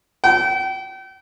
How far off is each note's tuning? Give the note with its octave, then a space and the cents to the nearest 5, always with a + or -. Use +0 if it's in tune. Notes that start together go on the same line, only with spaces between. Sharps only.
G5 -35